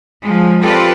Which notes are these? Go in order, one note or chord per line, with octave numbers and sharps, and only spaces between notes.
F3 G#3
C4 F4 G4 A4 B4 D5